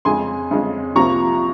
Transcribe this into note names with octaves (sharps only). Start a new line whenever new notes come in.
F2 C#3 G#3 G#5 C6
F2 C#3 G#3
C2 C3 F3 A#3 A#5 C#6